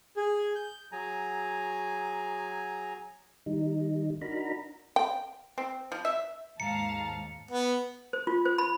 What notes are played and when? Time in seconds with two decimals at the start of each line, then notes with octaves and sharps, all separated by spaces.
0.17 G#4
0.55 G6
0.92 F#3 G#4 G#5 A#5
3.46 D#3 G3 D#4
4.21 D4 D#4 F#4 A#4 A#5 B5
4.96 G5
5.58 C4
5.92 F3
6.05 E5
6.60 D#2 G#2 F5 A5 A#5 C#7
7.51 B3
8.13 C5
8.27 F4
8.45 C5
8.58 B5